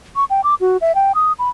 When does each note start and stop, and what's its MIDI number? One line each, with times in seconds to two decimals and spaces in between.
0.16 0.25 85
0.30 0.41 79
0.44 0.55 86
0.61 0.77 66
0.81 0.95 76
0.95 1.12 79
1.15 1.33 87
1.39 1.49 83